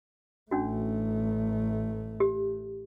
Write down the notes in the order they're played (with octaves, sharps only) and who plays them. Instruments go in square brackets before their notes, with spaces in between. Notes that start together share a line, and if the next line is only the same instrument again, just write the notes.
[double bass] A1 A3 [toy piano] C#4 D4 F#4
[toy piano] G4